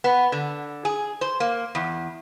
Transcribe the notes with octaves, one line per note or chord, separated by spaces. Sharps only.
B3
D3
G#4
C5
A#3
E2